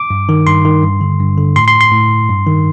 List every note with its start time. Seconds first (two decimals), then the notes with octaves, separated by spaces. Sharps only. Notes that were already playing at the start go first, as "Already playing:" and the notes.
Already playing: D6
0.10 G2
0.29 D#3
0.47 G2 C6
0.65 D#3
0.83 G2
1.01 D3
1.20 G2
1.38 D3
1.56 A2 C6
1.68 C6
1.81 C6
1.92 A2
2.29 G2
2.46 D#3